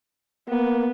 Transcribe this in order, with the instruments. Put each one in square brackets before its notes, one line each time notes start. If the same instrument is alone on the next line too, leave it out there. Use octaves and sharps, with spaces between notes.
[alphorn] A#3 [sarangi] B3